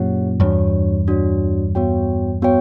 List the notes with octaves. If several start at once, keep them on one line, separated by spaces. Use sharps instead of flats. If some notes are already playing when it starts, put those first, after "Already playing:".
Already playing: F#2 A#2 G4 C#5 F#5
E2 G2 D4 F#4 C#5
D4 F#4 C#5
B3 F#4 C#5 G5
B3 F#4 C#5 G5